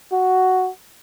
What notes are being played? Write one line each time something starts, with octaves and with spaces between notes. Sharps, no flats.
F#4